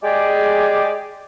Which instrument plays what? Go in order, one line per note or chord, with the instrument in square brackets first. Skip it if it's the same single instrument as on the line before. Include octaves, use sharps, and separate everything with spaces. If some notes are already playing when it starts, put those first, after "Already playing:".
[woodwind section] G#3 G4 G#4 D5